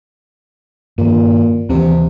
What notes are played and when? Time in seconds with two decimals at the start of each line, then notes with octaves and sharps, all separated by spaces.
0.98 G2 A#2 D#3
1.69 D#2 C3 E3